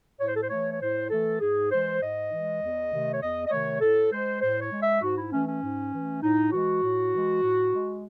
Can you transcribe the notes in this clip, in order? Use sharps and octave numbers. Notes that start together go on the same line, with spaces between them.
A2 C#5
C5
A4
C5
E3 A3 C#5
C#5
A2 C5
E3 A3 A4
G#2 G#4
E3 G#3 C5
G#2 D#5
E3 G#3
E2
C3 D#3 A3
C#5
E2 D#5
D#5
C3 D#3 A3 C#5
A2 A4
G#3 C5
A2 C5
C#5
G#3
E5
G#2 F#4
E4
E3 A3 C#4
C#4
G#2
E3 A3
A2 D#4
E3 G#3 F#4
A2
E3 G#3
A2
G#3